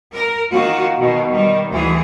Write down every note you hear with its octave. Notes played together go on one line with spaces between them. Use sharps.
A#4
D#3 A#3 F4 F#4
B2 D#3
D#3 G3
D2 E3 G#4